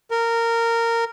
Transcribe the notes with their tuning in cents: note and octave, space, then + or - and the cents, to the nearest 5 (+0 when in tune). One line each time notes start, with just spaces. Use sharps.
A#4 -15